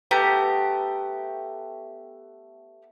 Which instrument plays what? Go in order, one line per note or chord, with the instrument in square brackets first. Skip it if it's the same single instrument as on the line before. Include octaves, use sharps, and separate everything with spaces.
[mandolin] A3 B3 G4 A#5